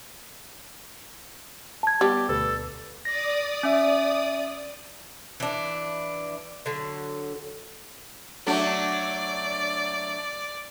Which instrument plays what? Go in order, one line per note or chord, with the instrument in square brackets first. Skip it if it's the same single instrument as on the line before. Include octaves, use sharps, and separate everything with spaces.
[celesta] A5 G#6
[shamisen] G3 [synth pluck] B3 [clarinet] G4
[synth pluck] D2 B2 B4 [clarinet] A4
[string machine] D5 D#6 [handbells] A#6
[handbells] C#4 E5
[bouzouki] E3 D4
D3 F#3
[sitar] F#3 A3 D4 [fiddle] D5